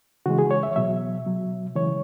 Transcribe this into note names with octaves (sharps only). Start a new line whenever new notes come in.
C#3 E3 G#3 F#4
G#4
C#5
E5
B2 F#3 E5
B2 F#3
C#3 E3 G#3 C#5